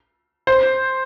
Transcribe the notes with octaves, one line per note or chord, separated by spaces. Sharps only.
C5